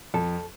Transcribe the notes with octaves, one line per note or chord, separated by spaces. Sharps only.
F2 A4